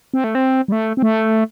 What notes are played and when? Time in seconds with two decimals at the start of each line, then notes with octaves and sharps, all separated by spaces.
0.14 C4
0.24 A3
0.35 C4
0.68 G3
0.72 A3
0.97 C4
1.02 A3